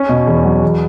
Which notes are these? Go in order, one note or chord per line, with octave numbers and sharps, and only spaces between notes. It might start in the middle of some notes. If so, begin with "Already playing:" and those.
Already playing: C#4
B2
E2
F#3
E2